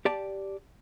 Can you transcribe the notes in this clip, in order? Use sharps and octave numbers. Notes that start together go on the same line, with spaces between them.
G4 D5 A5